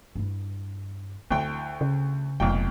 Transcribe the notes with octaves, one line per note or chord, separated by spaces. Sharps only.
G2 E4
D2 E4 G5
C#3
F1 B1 A#2 G5